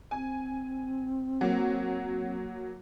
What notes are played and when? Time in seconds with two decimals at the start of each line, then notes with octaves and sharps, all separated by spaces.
0.11 C4 G#5
1.41 F#3 A#3